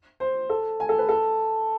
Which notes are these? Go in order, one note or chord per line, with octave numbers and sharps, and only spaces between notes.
C5
A4
G#5
A4
B4
A4